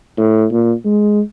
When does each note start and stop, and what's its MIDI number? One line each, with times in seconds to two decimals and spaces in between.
0.17 0.45 45
0.51 0.73 46
0.85 1.21 56